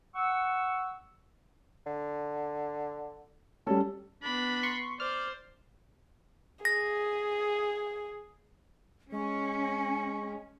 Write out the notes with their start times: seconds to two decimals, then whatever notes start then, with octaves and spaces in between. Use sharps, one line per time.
0.15 F#5 C#6 E6
1.86 D3
3.67 G3 C#4 A4
4.23 B3 D4 B5
4.63 C6 C#6
5.00 C5 D5 F6
6.65 G#4 A#6
9.12 G#3 C#4 G#5 C#6